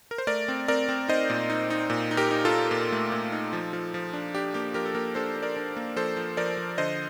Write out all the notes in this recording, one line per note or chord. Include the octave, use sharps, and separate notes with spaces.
A#4
C5
A3 A#4 D5
C4
C4 A#4 D5
C4
D#4 C5 D#5
A#2
D#4
D#4
A#2
D#4
G4 A#4
D#4
F4 A4
D#4
A#2
A3
A#2
D#4
F3
F3
F3
D4
D4 G4
A#3 G4
F3 G4 A#4
A4
A#3 G4 A#4
D4 A4 C5
D4
A#4 D5
D4
A#3
F3 A4 C5
F3
F3 A#4 D5
F3
D3 C5 D#5